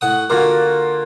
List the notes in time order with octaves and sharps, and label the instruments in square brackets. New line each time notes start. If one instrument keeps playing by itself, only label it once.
[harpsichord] A2 F#5 D#6
[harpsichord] D3 A#4 [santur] A#3 F4 F#4